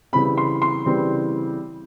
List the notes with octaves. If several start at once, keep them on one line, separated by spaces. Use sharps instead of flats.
C#3 E3 G3 C4 B5
C6
C6
C#3 E3 G3 C4